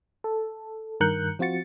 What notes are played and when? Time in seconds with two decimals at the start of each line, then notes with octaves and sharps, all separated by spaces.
0.24 A4
1.00 G2 D#3 A#4 F#6 G6 C#7
1.39 F3 C4 F4 F#4 A6 C#7